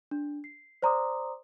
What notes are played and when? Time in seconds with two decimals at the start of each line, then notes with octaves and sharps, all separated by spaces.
0.11 D4
0.44 C7
0.82 C5 D5 A#5 C6 D6 D#6